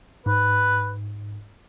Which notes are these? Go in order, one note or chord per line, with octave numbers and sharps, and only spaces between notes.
G#2 B4